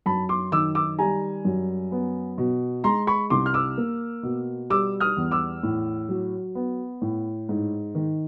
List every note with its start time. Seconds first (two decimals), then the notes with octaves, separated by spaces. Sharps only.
0.06 F#2 A5 B5
0.29 C6 D6
0.52 D#3 D6 E6
0.75 D6 E6
0.98 G3 G#5 A#5
1.45 F#2
1.92 B3
2.38 B2
2.84 G#3 A#5 C6
3.07 B5 C#6
3.30 C2 C6 D6
3.46 F6
3.54 D6 E6
3.78 A#3
4.23 B2
4.70 G3 D6 E6
5.00 D#6 F6
5.17 E2
5.31 D6 E6
5.63 A2
6.09 F#3
6.55 B3
7.02 A2
7.49 G#2
7.95 D#3